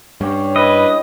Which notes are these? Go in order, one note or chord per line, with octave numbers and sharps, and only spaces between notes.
G2 C#4 G4 C#5
E4 B4 D#5